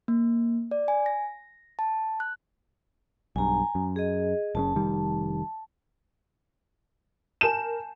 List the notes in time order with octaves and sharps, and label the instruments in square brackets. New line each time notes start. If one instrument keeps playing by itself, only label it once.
[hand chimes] A#3
D5
G#5
A#6
A5
F#6
[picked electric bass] B1 G2 [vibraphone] G#5 A#5
[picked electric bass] F#2
[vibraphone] G#4 D#5
[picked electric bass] F#1 A2 C#3 [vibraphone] A5
[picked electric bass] F1 D#3 G3
[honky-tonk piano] A#4 E7 [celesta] G#5 A5 G6